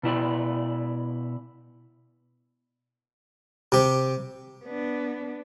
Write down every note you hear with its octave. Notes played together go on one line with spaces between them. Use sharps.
B2 E4 D5
C3 G4
B3 D4